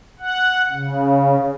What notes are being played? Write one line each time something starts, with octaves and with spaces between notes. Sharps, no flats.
F#5
C#3